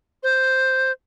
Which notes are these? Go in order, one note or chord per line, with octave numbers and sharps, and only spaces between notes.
C5